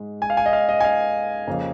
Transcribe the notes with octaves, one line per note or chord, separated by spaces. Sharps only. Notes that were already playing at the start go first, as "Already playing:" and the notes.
Already playing: G#2 G#3
G#5
F5
G#5
D#5
F5
D#5
G#5
F5
F2 C#3 A#3